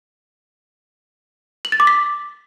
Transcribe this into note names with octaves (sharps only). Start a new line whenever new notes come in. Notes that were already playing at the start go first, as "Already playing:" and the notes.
F#7
A6
D6
B6